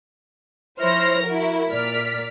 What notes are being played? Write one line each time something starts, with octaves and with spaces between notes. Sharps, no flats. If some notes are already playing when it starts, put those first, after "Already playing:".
F3 E4 C5 C#5 F6 A#6
E4 F#4 A#4
A#2 A#4 D5 F6 B6